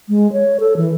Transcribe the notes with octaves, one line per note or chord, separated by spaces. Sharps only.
G#3
C#5
A4
E3